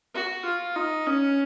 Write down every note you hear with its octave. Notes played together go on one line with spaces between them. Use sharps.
F#4
F4
D#4
C#4